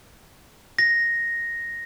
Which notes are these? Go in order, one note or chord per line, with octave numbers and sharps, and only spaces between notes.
A#6